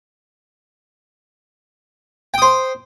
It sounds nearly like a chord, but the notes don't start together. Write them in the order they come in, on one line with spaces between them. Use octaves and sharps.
G5 D#6 C5